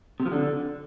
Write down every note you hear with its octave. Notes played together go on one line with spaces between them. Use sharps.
C3
F3
D3